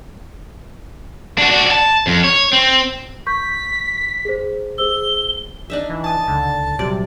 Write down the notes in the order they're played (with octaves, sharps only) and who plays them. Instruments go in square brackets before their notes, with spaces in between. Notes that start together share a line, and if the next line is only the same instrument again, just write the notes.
[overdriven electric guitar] D4 F#4
D4 F#4
D5 A5
F2
C#5
C4
[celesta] C#6 G6 [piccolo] B6
[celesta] G#4 C5
[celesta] G#4 C5 E6 [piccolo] G7
[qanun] D4 D#4 E5
[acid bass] E3
[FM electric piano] G#5 D#6 [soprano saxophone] A5
[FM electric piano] C#2 [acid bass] D3
[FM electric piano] A#1 F#3 G3 [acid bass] C3 [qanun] D5